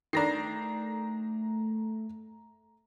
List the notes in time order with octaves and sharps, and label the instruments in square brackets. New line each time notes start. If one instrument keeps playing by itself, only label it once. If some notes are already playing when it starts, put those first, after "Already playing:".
[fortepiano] D#3 D4 [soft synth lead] A3 [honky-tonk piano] A#5 A#6 C7